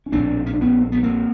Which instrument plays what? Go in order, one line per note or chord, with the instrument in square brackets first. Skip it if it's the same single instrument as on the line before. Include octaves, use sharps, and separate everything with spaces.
[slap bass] C#4
A#1 A2 C4 D4
C#4
D4
B3 C#4
C4
B3
A#3 C4